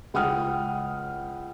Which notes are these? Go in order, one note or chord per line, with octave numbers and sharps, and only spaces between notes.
C#2 F#5 G5 D#6 F6